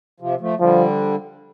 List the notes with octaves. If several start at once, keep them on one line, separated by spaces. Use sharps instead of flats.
C3 F3
F3 A3
D3 F3 G3